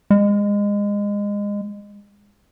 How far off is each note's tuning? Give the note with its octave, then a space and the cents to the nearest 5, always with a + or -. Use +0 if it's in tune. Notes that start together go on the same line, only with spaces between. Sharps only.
G#3 -25